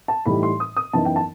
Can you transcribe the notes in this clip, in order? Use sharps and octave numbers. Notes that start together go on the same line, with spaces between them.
A5
A2 E3 G3 D#4 B5
C6
D#6
D#6
F#2 E3 B3 D#4 A5
G5
A5